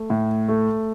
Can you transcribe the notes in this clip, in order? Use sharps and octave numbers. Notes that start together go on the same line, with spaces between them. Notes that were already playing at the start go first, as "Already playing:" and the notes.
Already playing: A3
A2
A3